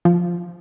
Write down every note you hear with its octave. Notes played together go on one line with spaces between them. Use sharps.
F3